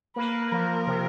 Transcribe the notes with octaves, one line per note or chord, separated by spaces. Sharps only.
A#3 B4
F3 A#4
C3